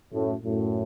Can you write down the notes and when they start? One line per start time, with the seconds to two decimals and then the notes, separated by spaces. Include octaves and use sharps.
0.13 F#2 A2
0.44 F#2 A2